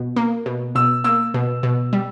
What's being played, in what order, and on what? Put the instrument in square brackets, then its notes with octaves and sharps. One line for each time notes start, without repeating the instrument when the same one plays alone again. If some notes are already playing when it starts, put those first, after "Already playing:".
Already playing: [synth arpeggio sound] B2
A#3
B2
[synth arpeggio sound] B2 [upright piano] E6
[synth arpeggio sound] A#3 [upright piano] E6
[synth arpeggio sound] B2
B2
G3